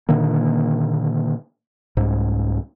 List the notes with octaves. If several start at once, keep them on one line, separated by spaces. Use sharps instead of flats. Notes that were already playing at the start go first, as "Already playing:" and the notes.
A#2 D3 D#3 A#3
C2 G#2